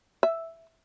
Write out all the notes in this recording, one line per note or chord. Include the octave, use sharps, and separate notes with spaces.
E5